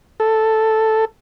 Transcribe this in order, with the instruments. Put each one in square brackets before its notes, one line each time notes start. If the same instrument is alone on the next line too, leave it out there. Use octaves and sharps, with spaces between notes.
[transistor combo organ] A4